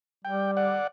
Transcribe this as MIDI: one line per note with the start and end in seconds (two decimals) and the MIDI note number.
0.25 0.76 55
0.25 0.51 79
0.57 0.87 74
0.57 0.87 78